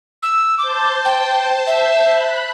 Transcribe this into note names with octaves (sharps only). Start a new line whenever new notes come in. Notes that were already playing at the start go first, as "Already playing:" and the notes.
E6
C5 A5 D6 G6
G5
E5
B5 F#6